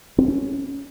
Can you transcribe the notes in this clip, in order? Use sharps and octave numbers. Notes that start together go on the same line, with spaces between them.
C4
C#4